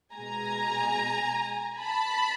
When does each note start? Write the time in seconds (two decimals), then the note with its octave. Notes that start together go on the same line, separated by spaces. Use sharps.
0.14 B2 G#3 G#5 A#5
1.79 A5 B5